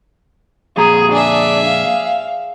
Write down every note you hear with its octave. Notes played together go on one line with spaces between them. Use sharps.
F2 A#2 G#4 A#5
D4 G#4 E5
F5